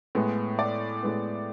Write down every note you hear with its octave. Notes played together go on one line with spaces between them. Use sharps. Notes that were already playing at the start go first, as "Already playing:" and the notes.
A2 G#3 B3
D5
A2 G#3 B3